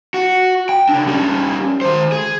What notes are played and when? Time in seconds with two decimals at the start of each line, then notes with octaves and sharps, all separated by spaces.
0.14 F#4
0.69 G5
0.89 C#3 D4
1.07 G3 C#4
1.81 D#3 C5
2.12 G#4